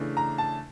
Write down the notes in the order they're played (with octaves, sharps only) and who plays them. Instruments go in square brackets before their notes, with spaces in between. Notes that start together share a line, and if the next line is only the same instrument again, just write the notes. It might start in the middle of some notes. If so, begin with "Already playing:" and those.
Already playing: [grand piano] C#3 E3 A3 D4
A#5
A5